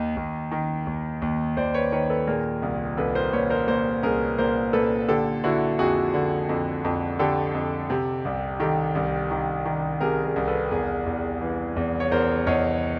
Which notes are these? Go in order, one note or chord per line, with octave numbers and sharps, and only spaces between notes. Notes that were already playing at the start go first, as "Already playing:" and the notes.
Already playing: D#2 D#3 D#5
D#2
D#3
D#2
D#2
D#2 C5 D5
B4 C#5
D#3 B4 C#5
A4 B4
A#2 G#4 A#4
C2
C2 A4 B4
A#4 C5
A#2 B4 C#5
A#4 C5
A#2 A#4 C5
C2 G#4 A#4
A#2 A#4 C5
A#2 A4 B4
D3 G4 A4
D3 E4 F#4
F2 F#4 G#4
D3
F2
F2
D3 G4 A4
F2
C3
C2
D#3 G4 A4
C2
D#3
D#3
C3 G#4 A#4
G#4 A#4
C2
A4 B4
E2 G#4 A#4
E2
E3
E2
C#5
E2 A#4 C5
E2 C#5 D#5